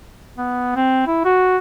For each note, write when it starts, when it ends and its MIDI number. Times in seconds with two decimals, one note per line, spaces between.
0.38 0.76 59
0.76 1.03 60
1.07 1.24 64
1.25 1.58 66